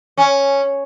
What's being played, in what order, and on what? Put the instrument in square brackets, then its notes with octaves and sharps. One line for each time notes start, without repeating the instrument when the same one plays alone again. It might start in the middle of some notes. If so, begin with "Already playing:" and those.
[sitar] C#4